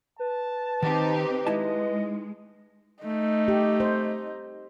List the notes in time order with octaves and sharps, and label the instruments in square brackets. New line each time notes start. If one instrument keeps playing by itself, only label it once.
[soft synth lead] B4 [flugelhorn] A5
[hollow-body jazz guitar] D#3 [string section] C4 D#4 G4
[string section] G#3 [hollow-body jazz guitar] D#4 E4 A5 [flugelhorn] D#5
[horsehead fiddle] A3 [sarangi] D#4
[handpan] G4
C5